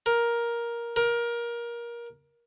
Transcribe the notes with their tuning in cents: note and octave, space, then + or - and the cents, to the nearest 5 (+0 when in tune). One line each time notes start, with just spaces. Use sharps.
A#4 +10
A#4 +20